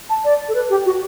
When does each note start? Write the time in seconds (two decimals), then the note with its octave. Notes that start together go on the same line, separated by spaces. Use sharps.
0.10 A5
0.25 D5
0.49 A4
0.55 B4
0.70 G4
0.86 F#4